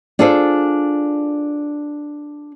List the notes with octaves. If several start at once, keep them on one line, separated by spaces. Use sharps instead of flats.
D4 F4 G#4 A4 C5 D5